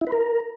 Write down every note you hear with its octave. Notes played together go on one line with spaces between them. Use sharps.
E4
B4
A#4